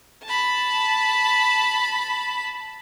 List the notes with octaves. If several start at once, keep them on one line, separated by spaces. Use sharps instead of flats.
A5 B5